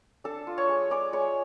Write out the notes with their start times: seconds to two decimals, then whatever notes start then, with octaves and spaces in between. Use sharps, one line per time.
0.24 D4 A4 A5
0.47 F4
0.58 C#5 C#6
0.69 G#3
0.90 G#3 D5 D6
1.13 G#3 C#5 C#6